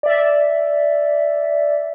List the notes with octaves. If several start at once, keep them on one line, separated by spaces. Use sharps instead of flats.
D5 E5